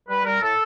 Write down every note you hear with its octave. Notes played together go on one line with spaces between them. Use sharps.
G3 B4
G3 A#4
A2 A4